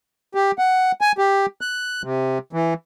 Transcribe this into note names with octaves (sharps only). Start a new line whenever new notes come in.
G4
F#5
G#5
G4
F#6
C3
E3